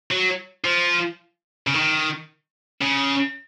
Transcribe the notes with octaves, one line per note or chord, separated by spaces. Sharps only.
F#3
F3
C#3
D#3
C#3